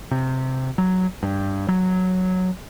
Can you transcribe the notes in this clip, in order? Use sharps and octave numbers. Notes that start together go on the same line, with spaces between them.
C3
F#3
G2
F#3